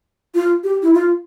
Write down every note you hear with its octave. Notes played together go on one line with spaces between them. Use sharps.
F4
G4
E4
F4